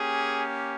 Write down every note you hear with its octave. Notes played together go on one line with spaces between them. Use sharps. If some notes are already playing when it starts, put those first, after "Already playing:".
Already playing: A#3 C#4 G4 G#4